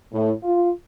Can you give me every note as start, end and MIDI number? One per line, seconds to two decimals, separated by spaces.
0.13 0.31 45
0.43 0.71 65